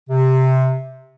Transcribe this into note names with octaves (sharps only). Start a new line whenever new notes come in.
C3